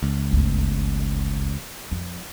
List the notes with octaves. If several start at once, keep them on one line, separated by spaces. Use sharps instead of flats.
C#2
G1 D2
F2